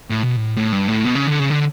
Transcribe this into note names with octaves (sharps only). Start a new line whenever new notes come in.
A2
B2
A2
A2
G2
A2
B2
C#3
D3
C#3
D3